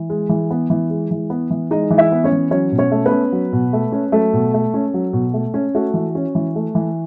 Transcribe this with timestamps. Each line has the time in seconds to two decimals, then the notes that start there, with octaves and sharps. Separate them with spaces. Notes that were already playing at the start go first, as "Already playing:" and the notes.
Already playing: E3
0.10 G#3
0.29 E3
0.50 B3
0.70 E3
0.90 G#3
1.11 E3
1.30 B3
1.50 E3
1.71 G#3 D#4 D#5
1.90 E3
1.98 E4 E5
2.12 B3
2.24 C#4 C#5
2.32 E3
2.51 F#3 C#4 C#5
2.72 B2
2.78 C#4 C#5
2.91 A3
3.05 B3 B4
3.11 C#4
3.32 F#3
3.53 B2
3.73 A3
3.92 C#4
4.12 F#3 A3 A4
4.33 B2
4.54 A3
4.74 C#4
4.94 F#3
5.13 B2
5.34 A3
5.54 C#4
5.75 A3 F#4
5.94 E3
6.15 C#4
6.35 E3
6.55 A3
6.75 E3